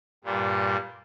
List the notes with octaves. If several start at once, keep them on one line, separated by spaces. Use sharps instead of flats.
G2 A#2 G3